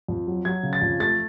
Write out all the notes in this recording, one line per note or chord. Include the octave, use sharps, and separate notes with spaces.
F2
F#3
F#3 G#6
C#3
A6
F2
A3 A6